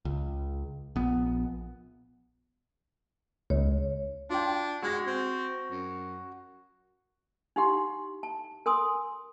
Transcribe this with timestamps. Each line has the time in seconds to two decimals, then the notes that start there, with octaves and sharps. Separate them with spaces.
0.05 C#2
0.96 A#1 B3
3.50 C#2 C#5
4.30 D4 F4 G5
4.82 G#3 F#4 A#6
5.07 C4
5.70 F#2
7.56 D#4 E4 G4 F#5 C6
8.23 A5
8.66 A#4 G#5 C6 D#6